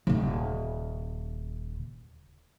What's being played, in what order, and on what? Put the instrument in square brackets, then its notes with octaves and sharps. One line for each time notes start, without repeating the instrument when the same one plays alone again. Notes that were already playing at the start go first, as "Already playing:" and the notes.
[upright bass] D#1 C#3